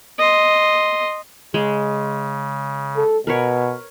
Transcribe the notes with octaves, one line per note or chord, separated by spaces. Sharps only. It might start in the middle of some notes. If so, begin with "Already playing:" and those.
D#5 C6
C#3 G#3
A4
B2 A#4 B4 C#5